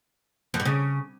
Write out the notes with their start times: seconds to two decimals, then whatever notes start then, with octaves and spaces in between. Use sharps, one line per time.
0.54 F2
0.60 G2
0.65 C#3